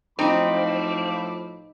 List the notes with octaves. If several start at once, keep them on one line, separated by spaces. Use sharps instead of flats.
A2 F3 C4 D#4 D#5 B5 D6